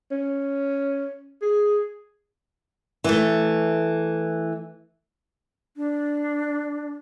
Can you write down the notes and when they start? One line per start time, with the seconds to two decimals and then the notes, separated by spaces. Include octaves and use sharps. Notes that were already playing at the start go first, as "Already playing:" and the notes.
0.11 C#4
1.42 G#4
3.04 E3 A3
5.77 D4